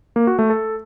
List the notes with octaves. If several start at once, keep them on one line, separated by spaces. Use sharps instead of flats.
A#3
F#4
A3
A4